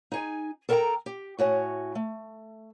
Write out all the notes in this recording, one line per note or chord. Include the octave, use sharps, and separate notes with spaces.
D#4 G#4 G#5
A4 A#4 E5 F#5 G5 A#5
G4
A2 F#4 C#5 G#5
A3